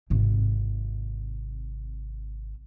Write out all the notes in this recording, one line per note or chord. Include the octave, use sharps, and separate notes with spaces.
G#1 C3